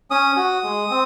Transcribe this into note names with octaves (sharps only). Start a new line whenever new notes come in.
C#4 D#6
F#4
G#3
C4